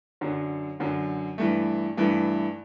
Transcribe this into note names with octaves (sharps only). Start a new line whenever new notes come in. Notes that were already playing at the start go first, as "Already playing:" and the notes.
F#2 D3 F#3
F#2 D3 F#3
G2 E3 A3
G2 E3 A3